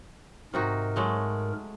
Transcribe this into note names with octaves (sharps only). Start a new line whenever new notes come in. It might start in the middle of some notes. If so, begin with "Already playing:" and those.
G#2 C3 D#4 F#4 A#4
F#3 G#3 A3